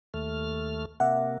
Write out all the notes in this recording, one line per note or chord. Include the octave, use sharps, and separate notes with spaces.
D#2 A3 F6
C3 A#3 E5 F#5